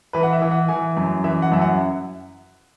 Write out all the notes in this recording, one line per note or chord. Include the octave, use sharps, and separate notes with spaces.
E3 B4
F#5
E5
E3
F#5
E3 G#5
F#2
E3 E5
F#5
F#2 E5
F#5